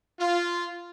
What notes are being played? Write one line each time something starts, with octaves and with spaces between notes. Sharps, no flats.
F4